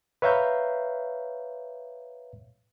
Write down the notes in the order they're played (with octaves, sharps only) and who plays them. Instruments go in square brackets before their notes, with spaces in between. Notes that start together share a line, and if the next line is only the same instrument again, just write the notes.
[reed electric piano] B4 C#5 E5 F5 A#5 G6